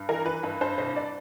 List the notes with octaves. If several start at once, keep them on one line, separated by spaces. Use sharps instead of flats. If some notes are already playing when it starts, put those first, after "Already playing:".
Already playing: G2
E3 A#4
E3 B4
G2 B4
G2 C5
C2 C5
D5